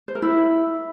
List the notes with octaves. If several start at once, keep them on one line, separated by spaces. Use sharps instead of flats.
C5
A#4
E4